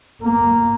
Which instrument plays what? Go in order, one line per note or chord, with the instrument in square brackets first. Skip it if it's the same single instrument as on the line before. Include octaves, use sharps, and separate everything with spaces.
[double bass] A#3